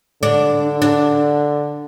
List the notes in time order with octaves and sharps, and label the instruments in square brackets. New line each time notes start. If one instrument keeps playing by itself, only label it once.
[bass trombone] D3 [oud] D4
[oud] D4